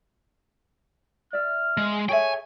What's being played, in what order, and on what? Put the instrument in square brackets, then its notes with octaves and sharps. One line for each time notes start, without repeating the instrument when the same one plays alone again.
[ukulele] D5 E5 [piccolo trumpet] F6
[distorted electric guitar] G#3
[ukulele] G#4 A4 E5 [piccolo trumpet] C#5 [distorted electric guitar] G5 G#5